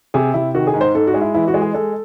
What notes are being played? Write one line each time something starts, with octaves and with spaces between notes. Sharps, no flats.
C3 G#4
C3 E4
D#3 F#4
G#4
G#2
C5
G#2 A4
F#4
G#3
E4
E3 E4
F#4
G#3
G#4
G#3 A4